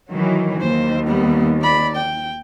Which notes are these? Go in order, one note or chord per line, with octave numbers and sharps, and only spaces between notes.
D#3 E3 F#3
D#2 C5
G3 B3
D5 B5
G5